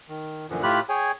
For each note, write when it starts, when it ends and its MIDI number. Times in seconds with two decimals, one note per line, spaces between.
0.09 0.47 51
0.50 0.63 42
0.50 0.63 46
0.50 0.63 50
0.50 0.63 52
0.50 0.63 53
0.63 0.80 45
0.63 0.80 57
0.63 0.80 65
0.63 0.80 67
0.63 0.80 83
0.63 0.80 90
0.89 1.12 68
0.89 1.12 73
0.89 1.12 79
0.89 1.12 80